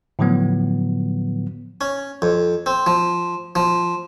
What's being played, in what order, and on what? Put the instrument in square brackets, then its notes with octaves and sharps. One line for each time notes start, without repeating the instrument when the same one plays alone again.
[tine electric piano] A2 D3 F3 F#3 B3
[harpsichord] C#4
F2
C4
F3
F3